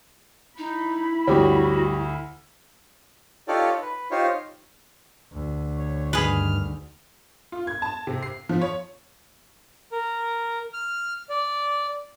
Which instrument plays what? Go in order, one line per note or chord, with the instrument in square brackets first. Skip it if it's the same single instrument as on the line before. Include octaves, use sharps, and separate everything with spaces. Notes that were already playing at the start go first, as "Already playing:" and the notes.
[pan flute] D#4 [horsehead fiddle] E4 B5
[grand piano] D2 [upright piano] G2 G4 C#5 [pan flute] F#4
[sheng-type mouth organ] D#4 F4 G4 A4 C#5 D5
B4
D#4 F4 G4 C5 C#5
[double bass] D2
[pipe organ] C#5
[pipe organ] G2 D#3 F6 [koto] G#4 B4
[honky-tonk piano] F4
G#6
A5
C3
C7
F3
C#5
[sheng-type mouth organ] A#4
F6
D5